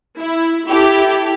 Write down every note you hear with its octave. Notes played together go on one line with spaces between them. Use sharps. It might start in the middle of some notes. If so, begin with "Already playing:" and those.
E4
E4 G4 A4